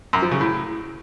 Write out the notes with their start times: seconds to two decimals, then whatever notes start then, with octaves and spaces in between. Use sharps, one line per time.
0.13 F#2
0.22 F3
0.31 C#3
0.41 A2